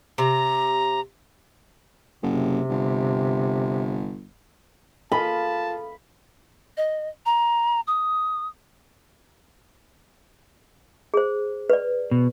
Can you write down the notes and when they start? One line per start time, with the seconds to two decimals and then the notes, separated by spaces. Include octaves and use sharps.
0.18 C3 A#5
2.23 F#1 C3
2.70 G1
5.12 F4 A4 F5 A5 B5
6.77 D#5
7.26 A#5
7.87 D#6
11.14 G#4 C5
11.70 B4 D5
12.11 B2